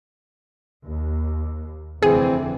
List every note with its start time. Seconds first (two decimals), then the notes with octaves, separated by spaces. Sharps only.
0.83 D#2
2.02 F1 D3 E3 C4 G#4